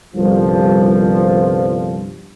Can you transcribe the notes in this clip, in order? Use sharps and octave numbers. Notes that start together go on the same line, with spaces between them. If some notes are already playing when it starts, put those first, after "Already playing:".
G1 C2 G2 F3